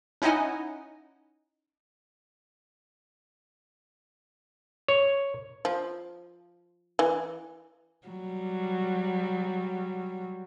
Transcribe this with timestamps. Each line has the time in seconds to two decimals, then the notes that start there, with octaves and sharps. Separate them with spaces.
0.22 C#4 D#4 E4 D#5 F#5 G#5
4.88 C#5
5.65 F3
6.99 E3
8.07 F#3 G3